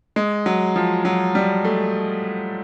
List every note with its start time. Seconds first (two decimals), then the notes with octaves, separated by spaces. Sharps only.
0.16 G#3
0.46 F#3
0.76 F3
1.05 F#3
1.35 G3
1.65 A3